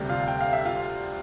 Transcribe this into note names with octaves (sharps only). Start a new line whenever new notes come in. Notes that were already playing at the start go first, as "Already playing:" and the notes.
Already playing: D2 C3 G3
F4 F5
G5
F5
E5
F4 F5